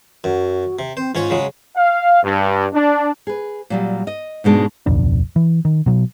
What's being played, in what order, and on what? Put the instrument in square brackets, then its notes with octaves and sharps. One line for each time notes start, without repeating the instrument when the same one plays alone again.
[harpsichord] F#2 [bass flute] F#4
[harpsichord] C3
[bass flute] C4 [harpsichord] C5
[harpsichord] G#2 C#4 C#5 [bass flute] F4
[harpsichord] C#3 F#3 G#3
[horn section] F5
G2
D4
[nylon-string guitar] G#4 B4
A#2 F#3 G3
D#5
G#2 B2 G#3 D4
[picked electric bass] D1 B1 F2 D4
E3
D#3
B2 F#3